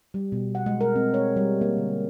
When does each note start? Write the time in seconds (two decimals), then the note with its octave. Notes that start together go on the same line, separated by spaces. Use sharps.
0.14 G3
0.32 B2
0.55 F#5
0.66 G#3
0.81 A#4
0.96 C4
1.14 C#5
1.37 G3
1.61 A#3
1.78 D3